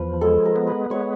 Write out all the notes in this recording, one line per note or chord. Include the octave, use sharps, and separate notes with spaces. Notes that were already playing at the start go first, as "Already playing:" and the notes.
Already playing: E2 F3 B4
G#3 A4
A#4
B3
B4
G#3 C#5